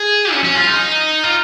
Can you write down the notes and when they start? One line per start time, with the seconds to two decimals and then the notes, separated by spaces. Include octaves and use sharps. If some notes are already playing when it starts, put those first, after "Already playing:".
Already playing: G#4
0.32 C#4
0.44 C#4
0.55 F4
0.67 D#4
1.23 F4